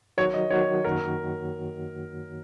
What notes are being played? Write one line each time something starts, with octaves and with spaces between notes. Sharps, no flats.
D#3 F#3 D#4 F#4 A#4 C#5
D#5
D#3 F#3 D#4 F#4 A#4 C#5
F#2 D#3 A#3 F#4 A#4 C#5